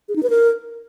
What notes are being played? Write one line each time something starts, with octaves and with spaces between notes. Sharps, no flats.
G#4
D#4
B4
A#4